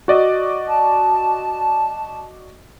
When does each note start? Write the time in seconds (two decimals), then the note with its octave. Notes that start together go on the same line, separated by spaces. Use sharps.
0.08 F#4 D5 D#5
0.68 A5